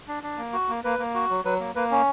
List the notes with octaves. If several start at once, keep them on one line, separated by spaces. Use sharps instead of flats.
D4
D4
A#3
F#4
A#3
A#3 B4
A#3
F#4
F#3
F#3 B4
A#3
A#3 B4
C#4